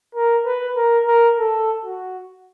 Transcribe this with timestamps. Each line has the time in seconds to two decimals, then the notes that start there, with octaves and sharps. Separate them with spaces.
0.15 A#4
0.45 B4
0.76 A#4
1.07 A#4
1.38 A4
1.85 F#4